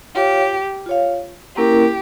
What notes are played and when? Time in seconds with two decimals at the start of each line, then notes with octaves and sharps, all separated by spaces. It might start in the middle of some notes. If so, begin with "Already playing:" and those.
0.15 F4 G4 C#5 F5
0.86 F4 C#5 F5
1.57 A#3 C#4 E4 G4 A#4